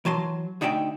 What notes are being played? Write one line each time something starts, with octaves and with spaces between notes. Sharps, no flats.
E3 F#3 A5 C6
D2 D#4 D5 E5 G5